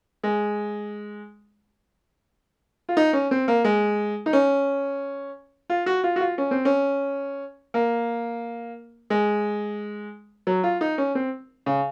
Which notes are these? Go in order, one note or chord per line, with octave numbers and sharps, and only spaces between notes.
G#3
F4
D#4
C#4
C4
A#3
G#3
D#4
C#4
F4
F#4
F4
F#4
F4
C#4
C4
C#4
A#3
G#3
F#3
F4
D#4
C#4
C4
C#3